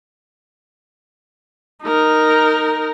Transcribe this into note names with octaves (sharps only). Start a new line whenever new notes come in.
D#4 A#4